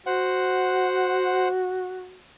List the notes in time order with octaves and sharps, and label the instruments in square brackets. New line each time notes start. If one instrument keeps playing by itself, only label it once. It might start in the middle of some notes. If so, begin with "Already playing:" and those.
[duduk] F#4 [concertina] C5 F#5